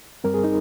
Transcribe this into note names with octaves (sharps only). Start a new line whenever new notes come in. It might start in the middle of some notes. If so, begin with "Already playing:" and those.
G2 G3 C4 A#4
G#4
D#4